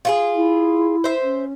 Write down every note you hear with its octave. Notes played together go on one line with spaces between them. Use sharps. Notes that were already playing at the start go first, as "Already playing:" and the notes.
F4 F#4 G#4
E4
C5 E5
C#4